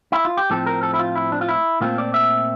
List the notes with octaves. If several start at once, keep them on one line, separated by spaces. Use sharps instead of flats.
E4
F4
G4
A2 F3 C4 A4
A#4
A4
E4
F4
E4
D4
F4
E4
A#2 A3 C4 F4
D5
E5